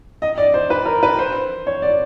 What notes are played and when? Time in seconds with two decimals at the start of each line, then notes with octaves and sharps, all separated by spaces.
0.22 D#5
0.38 D5
0.54 C5
0.70 B4
0.86 A#4
1.03 B4
1.19 C5
1.67 C#5
1.82 D5